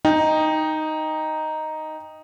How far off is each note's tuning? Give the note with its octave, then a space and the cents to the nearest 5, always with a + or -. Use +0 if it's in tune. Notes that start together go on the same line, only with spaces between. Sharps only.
D#4 +0 G5 +15